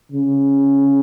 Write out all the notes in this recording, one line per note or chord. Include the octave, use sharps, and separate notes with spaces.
C#3